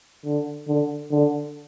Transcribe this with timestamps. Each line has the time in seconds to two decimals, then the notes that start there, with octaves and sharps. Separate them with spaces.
0.25 D3
0.67 D3
1.11 D3